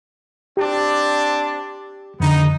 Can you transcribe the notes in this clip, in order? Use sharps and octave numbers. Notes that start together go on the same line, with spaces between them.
C4 D4 G4
F2 D3 B3 D#4